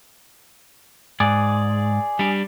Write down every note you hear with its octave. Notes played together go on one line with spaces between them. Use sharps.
G#2 G#4 D5
G3 D4